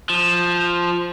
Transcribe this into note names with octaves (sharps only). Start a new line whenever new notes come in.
F3